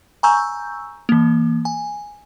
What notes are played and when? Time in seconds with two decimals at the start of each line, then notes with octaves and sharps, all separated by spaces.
0.23 G#5 A#5 C#6 E6 G6
1.09 E3 A#3
1.65 G#5